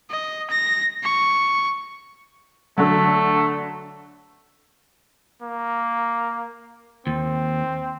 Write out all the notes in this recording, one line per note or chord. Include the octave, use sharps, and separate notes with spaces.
D#5
A#6
C#6
D3 F#3 A3
A#3
D#2 C4